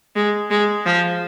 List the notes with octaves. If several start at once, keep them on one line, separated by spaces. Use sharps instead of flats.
G#3
G#3
F3